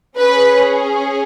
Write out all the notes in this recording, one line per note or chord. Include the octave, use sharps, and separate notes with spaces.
C#4 G#4 B4